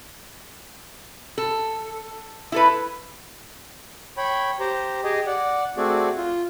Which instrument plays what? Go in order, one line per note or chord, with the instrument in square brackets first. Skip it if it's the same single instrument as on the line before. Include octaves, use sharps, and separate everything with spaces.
[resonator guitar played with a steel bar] A4
E4 A4 B4
[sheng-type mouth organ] C#5 G5 B5
G4 C5 A#5
G4 G#4 D#5
D5 F#5
A3 C4 F#4 G#4 D5
F4